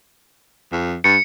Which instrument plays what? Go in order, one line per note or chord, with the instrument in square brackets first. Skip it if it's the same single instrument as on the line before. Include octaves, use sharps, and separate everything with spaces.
[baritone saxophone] F2
[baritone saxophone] G2 [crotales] C#7